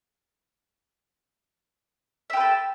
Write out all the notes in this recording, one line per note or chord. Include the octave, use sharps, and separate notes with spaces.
G4 A4 B4 E5